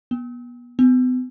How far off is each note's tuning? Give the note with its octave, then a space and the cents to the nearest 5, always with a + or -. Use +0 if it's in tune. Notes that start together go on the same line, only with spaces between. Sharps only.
B3 -30
B3 +40